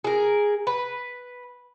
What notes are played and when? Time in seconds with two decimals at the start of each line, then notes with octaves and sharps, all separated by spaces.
0.04 G#4 A#4
0.67 B4